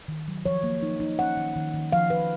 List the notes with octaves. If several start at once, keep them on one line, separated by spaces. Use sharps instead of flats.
D#3
F#3
F3 C#5
A#3
D#4
D#4
C#4 F#5
D#3
D#3
D#3
F3 F5
F3 B4